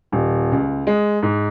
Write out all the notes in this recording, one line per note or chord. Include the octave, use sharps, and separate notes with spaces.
D#1
C#2
G#3
G#2